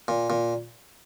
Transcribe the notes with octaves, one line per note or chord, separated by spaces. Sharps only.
A#2
A#2